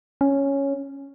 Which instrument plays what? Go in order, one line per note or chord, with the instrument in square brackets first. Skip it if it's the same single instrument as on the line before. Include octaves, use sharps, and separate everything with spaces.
[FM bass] C#4